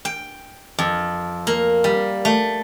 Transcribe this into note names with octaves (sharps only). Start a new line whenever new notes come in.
G5
F2
A#3
G3
A3